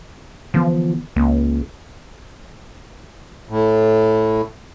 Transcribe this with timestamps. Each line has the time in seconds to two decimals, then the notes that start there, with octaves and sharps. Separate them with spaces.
0.54 D3 E3 F3 B3
1.16 C#2 A#3
3.49 A2